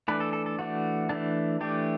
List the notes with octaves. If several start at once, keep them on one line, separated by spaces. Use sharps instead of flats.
E3 A3 D4 B4
A4
A4
A4
E3 A3 D4 F#4
E3 A3 D4
E3 A3 D4 G4